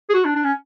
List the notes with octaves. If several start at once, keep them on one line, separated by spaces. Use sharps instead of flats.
G#4
F#4
D4
D4
C#4